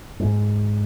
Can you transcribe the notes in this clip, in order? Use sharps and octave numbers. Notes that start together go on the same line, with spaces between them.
G#2